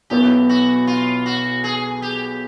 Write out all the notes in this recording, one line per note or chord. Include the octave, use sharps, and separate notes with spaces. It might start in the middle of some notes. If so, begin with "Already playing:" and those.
B1 B2 F#3 B3 E4 G4
F#4
F4
F#4
G#4
G4